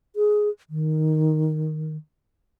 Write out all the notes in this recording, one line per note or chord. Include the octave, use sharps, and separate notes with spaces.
G#4
D#3